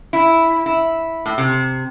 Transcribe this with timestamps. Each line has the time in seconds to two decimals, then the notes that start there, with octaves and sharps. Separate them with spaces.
0.13 E4
0.66 E4
1.26 A2
1.38 C3